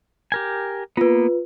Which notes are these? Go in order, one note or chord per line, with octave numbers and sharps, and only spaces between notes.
G4 A#4 G#5
A#3 B3 F4 B4